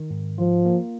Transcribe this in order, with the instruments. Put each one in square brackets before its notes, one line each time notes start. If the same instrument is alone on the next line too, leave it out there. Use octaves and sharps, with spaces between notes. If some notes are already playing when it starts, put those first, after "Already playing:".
Already playing: [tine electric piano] D#3
G#2
[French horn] F3 [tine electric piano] F4
[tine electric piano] A#3